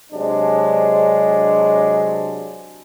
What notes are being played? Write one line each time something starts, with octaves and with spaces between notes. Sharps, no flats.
C3 F#3 G#3 D4